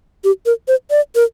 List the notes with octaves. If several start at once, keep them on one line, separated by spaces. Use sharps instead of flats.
G4
A#4
C5
D5
A#4